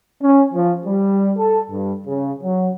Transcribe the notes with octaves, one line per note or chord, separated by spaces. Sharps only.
C#4
F3
G3
A4
G2
C#3
F#3